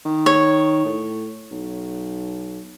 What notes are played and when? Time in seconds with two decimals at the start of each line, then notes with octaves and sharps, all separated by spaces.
0.05 D#3
0.26 C#5
0.85 A2
1.52 B1